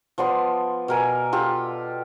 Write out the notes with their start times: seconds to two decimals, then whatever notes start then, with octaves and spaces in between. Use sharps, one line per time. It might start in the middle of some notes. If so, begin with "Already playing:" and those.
0.18 F3 B3 D5 C6
0.88 B2 A#4 G#5
1.33 F4 G4 A4